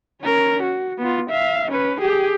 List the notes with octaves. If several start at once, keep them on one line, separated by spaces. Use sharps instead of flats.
C#4 A#4
F#4
B3 F4
E5 F5
C#4 B4
G4 G#4